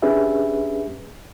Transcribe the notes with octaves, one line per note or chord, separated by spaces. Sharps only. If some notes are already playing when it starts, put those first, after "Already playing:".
C#4 D4 G4 G#4 B4 E5